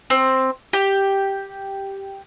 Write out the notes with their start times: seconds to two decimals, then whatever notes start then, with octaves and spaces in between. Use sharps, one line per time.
0.10 C4
0.73 G4